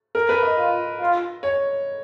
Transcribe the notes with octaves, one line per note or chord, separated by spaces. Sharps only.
A#4
B4
D#5
F4
F4
C#5